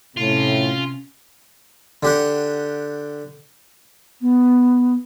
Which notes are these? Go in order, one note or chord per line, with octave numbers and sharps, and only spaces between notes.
A2 C3 C#4 F4
D3 G4 F#5
B3